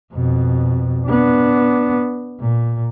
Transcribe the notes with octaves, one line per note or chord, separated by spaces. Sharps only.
F2 B2
B3 D4
A#2